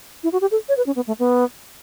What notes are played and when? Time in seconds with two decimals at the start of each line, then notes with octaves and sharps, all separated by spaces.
0.24 E4
0.33 F#4
0.41 G4
0.51 A4
0.69 C#5
0.77 B4
0.86 C#4
0.96 B3
1.07 A3
1.19 B3